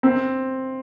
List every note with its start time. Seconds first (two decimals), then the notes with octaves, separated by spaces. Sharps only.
0.03 C4